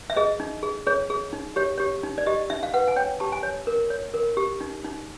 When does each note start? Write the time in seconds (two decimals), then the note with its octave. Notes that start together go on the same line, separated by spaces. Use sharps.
0.10 E5
0.16 G#4 D#5
0.40 D#4
0.63 G#4
0.86 G#4 C#5
1.10 G#4
1.33 D#4
1.56 G4 C#5
1.78 G4 C#5
2.03 D#4
2.18 D5
2.26 G4 D#5
2.50 D#4 E5
2.63 F5
2.74 B4 F#5
2.88 G#5
2.96 C#5 G5
3.20 G4 A5
3.32 G#5
3.43 C#5
3.67 A#4
3.90 C#5
4.14 A#4
4.37 G4
4.61 D#4
4.84 D#4